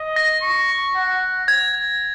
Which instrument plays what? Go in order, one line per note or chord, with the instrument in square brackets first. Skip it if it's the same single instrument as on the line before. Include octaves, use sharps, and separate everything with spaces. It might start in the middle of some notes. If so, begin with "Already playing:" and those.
Already playing: [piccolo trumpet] D#5
[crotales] A#6
[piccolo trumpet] C#6
F#5
[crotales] G#6